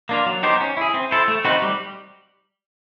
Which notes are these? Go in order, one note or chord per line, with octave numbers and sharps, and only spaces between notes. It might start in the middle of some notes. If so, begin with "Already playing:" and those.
A#3 D4 F4
F#3
B3 D#4 G4 C5
C#4
E4 G#4
C4
E4 A4 C5
A3
C4 D#4 F#4 B4
G3